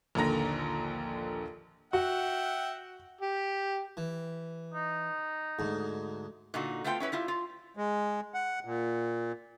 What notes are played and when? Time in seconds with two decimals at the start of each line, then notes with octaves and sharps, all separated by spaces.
0.15 A#1 D#2 D3 A#5 A#6
1.93 F#4 E5 F#5 G5
3.21 G4
3.97 E3
4.74 D#4
5.59 D2 G#2
6.54 A#2 D3 D#4 F#4
6.84 A3 B3 C4 F4 G5
7.00 C#4 E4 B4 C#5
7.12 G3 E4 F4
7.28 F4
7.77 G#3
8.34 F#5
8.65 A#2